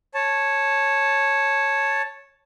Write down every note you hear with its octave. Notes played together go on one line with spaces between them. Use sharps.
C#5 A5